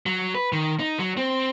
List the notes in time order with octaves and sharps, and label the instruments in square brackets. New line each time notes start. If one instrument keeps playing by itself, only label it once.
[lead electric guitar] F#3
B4
D#3
D#4
F#3
C4